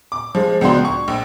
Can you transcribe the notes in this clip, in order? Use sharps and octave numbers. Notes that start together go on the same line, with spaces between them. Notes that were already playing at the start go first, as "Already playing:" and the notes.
D6
F3 G#3
C#2 B3 D4 F#4 C6
C#6
A#1